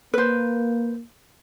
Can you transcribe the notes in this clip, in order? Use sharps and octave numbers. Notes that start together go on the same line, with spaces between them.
A#3 B4 C5